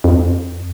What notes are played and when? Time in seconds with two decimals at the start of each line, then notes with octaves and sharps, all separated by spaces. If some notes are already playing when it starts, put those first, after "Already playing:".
0.04 F2